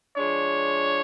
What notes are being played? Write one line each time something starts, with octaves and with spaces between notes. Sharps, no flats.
F3 G#3 D4 C#5